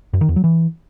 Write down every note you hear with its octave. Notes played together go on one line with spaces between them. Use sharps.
F#2
D#3
E2
F#3
E3